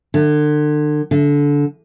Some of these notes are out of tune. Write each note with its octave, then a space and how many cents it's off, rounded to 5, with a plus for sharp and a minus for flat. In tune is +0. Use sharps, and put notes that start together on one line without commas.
D3 +35
D3 -20